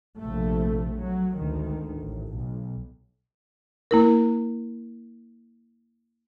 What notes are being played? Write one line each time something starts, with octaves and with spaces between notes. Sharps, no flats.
A#1 C3 F3 A3
F#3
G#1 D2 D#3
A1
B1
A#3 E4 A#4